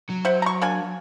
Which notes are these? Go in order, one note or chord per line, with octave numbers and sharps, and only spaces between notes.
F#3
C5 E5 F#5
A#5 C#6
A#3 D4 G#5